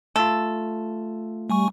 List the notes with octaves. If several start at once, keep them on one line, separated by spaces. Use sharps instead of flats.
A3 F4 A4
G3 A3 G#5 C#6